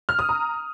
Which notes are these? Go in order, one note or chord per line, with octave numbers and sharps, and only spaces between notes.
F6
D#6
A#5